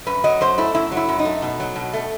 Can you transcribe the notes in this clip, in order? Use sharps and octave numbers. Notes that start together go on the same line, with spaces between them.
F#2 B4
F#3 D#5
F#2 C5
A3 E4
F#2 E4
F#3
E4
F#2
D#4
A3
B2
F#3
B2
A3